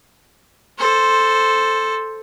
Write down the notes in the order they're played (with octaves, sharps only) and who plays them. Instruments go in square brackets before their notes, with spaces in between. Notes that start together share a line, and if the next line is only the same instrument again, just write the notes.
[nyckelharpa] A4 C5